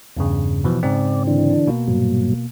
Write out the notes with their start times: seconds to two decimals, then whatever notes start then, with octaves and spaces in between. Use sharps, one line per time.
0.17 E2 G2 C#3
0.64 B2 E3 F3
0.83 G#2 C#3 C4 D5
1.27 D3 E3 D4
1.67 B2 A#3
1.88 G2 A#2 F#3